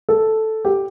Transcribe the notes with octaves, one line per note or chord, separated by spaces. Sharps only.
A4
G4